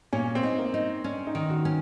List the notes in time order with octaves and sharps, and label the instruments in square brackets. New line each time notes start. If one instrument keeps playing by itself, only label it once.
[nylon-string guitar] A#2 [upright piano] C#4
[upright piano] C4
[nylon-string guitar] D#4
[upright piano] A#3
[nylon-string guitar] D#4
[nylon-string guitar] C#4 [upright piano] D4
[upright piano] D#4
[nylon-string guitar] D#3
[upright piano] F#4
[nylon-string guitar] C#4